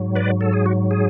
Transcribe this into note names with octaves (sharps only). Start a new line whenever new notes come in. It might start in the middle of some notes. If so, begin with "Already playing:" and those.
Already playing: G#2 F#3
B4 D5
A4
G#4
F#4
G#4